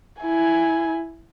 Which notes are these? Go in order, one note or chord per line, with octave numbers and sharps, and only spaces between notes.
E4 G#5